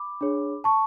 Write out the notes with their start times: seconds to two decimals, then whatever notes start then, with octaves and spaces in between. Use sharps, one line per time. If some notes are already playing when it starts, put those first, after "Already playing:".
Already playing: B5 D6
0.21 D4 G#4 C#5
0.64 A5 C#6